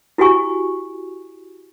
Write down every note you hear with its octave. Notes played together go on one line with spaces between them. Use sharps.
E4 F#4 G4 G#5 C#6